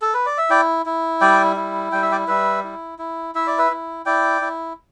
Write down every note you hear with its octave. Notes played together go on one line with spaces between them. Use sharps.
A4
B4
D5
E5
E4 D5 G5
E4
G3 D5 G5
E4
G3 G5
E5
D5 G5
G3 B4 E5
E4
E4
E4 E5
D5
B4 E5
E4
E4 D5 G5
E4